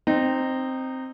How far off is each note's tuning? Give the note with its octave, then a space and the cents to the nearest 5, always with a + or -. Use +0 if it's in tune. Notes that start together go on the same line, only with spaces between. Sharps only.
C4 +0 D#4 -20